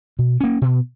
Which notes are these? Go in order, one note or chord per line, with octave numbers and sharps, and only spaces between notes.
B2
A#3 C#4
B2